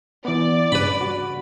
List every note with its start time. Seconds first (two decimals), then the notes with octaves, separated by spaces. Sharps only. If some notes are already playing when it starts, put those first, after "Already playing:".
0.25 E3 B3 D5
0.72 G2 C#3 D4 B4 B5
1.01 F#4